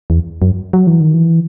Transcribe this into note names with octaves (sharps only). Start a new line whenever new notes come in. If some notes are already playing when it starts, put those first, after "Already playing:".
E2
F#2
F#3
E3
D#3
E3